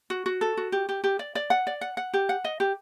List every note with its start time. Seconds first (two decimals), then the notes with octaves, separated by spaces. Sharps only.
0.10 F#4
0.26 F#4
0.41 A4
0.57 F#4
0.72 G4
0.89 G4
1.04 G4
1.19 D5
1.35 D5
1.50 F#5
1.67 D5
1.81 F#5
1.97 F#5
2.13 G4
2.29 F#5
2.44 D#5
2.60 G4